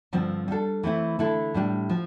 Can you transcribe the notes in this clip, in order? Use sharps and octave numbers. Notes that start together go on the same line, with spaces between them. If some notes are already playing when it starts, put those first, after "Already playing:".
G2 D3 F3 C4
G3 D4 A4
E3 A3 C4 E4
D3 A3 E4 A4
A2 G3 D4 G4
F3